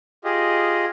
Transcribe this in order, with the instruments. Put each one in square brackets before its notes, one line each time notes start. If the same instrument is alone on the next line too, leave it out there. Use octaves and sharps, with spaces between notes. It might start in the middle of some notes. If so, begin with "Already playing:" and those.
[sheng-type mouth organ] F4 G4 G#4 D#5